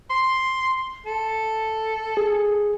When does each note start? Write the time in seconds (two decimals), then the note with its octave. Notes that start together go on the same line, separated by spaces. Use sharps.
0.10 C6
1.06 A4
2.17 G#4